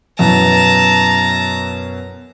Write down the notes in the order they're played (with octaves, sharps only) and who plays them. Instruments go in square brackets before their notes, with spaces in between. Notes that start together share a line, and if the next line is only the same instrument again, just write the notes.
[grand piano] F#2 B2 E3 [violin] A5 A#5